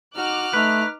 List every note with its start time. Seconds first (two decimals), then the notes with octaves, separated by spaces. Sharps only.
0.15 D#4 F#4 D6 F6 F#6
0.54 A3 D#4 B4